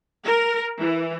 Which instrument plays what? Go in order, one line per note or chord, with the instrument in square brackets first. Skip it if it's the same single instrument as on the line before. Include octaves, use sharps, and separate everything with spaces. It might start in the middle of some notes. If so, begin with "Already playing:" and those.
[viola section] A#4
E3